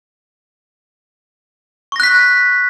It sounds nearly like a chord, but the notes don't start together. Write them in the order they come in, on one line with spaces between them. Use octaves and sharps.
C#6 A#6 F#6 B6